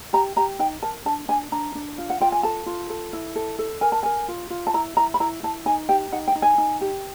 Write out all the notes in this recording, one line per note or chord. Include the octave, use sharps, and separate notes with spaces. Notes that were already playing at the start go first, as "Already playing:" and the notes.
G4 A#5
G4 A#5
D#4 G5
A#4 A5
D4 A5
D4 G#5
D4 A#5
D4
F4
F#5
F4 G5
G#5
A4 A5
F4
A4
E4
A4
A4
A#4 G#5
A5
A#4 G#5
F4
F4
A5
E4 A#5
E4 A#5
B5
E4 A#5
E4 A5
D#4 G#5
G4 G5
D#4 F#5
G5
D#4
G#5
D#4
G4